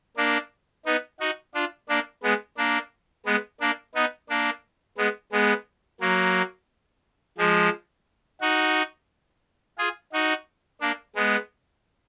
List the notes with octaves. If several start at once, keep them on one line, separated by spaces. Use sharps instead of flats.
A#3 D4
B3 D#4
D#4 F#4
D4 F4
A#3 D4
G#3 B3
A#3 D4
G#3 B3
A#3 D4
B3 D#4
A#3 D4
G#3 B3
G#3 B3
F#3 A#3
F3 G#3
D#4 F#4
F4 G#4
D#4 F#4
A#3 D4
G#3 B3